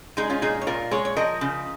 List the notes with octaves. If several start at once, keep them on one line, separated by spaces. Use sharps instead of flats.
G#3 D#4 G#4
C#4 F4
A#2 D#4 G#4
C#5
A#2 F4 A#4
G#3 G#4 C#5
C#5
F3 A#4 D#5
C#3